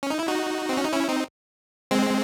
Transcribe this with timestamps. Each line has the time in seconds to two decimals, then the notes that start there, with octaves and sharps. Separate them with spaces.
0.03 C#4
0.10 D#4
0.19 E4
0.27 D#4 F#4
0.69 C4
0.77 C#4
0.85 D#4
0.92 C#4 E4
1.09 C4 D#4
1.91 G#3 C4